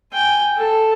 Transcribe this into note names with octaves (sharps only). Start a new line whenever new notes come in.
G5 G#5
A4